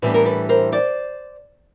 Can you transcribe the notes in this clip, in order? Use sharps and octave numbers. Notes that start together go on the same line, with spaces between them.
A2 E3 G3 B3 D4 B4
A#4
A4 B4
A#4 C5
C5 D5